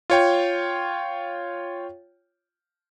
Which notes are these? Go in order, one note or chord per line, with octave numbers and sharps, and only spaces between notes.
F4 C#5 G5